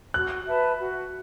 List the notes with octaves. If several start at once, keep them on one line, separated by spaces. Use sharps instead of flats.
F#4 F#6
B4 E5 A5
F#4